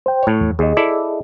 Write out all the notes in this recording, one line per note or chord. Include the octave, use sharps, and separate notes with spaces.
C5 G5
A2 C#5
E2
D#2 G#4 D#5
E4 A4 D5